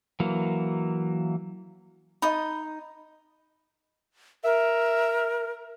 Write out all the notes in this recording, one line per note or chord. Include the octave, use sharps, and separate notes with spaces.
E3 F#3 A#3
D#4 D#5 B5 D#6
A#4 E5